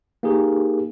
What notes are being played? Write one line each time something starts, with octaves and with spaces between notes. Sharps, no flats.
A#3 D#4 G4 G#4 A#4